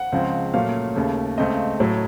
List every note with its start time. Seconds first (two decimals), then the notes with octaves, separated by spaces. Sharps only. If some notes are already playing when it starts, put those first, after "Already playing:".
Already playing: F#5
0.12 C#2 C#3 F3 C4
0.54 A#2 F#3 A3 C#4 F5
0.96 D#2 C#3 A3
1.38 C#2 C#3 A3 C4 D#5
1.80 A2 F#3 A3